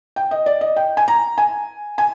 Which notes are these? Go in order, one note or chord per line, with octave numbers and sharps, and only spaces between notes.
G5
D#5
D5
D#5
G5
G#5
A#5
G#5
G#5